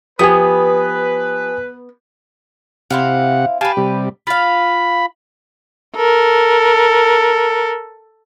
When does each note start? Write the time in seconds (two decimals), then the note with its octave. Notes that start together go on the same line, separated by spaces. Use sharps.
0.19 F3 B3 G4 B4 G#5 D#6
2.91 C3 C4 E4 F5 F#5
3.61 G4 B4 F5 G#5 A5
3.77 C3 G3
4.27 F4 F5 B5
5.96 A4 A#4